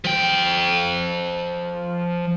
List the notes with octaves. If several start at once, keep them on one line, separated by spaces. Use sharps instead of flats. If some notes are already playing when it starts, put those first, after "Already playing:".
F3 G5